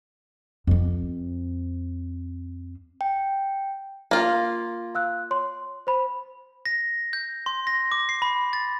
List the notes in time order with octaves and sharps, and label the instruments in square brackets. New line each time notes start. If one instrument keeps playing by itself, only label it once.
[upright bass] F2 C4
[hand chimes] G5
[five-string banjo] A#3 F4 [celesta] A#5
[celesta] F5 E6 F#6
C#5 C6
C5 B5
[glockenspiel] A#6
G6
C6
A#6
D6
C7
B5
A6